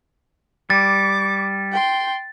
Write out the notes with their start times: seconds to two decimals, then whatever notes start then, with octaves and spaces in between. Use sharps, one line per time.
0.70 G3 D6 A6
1.71 G5 C6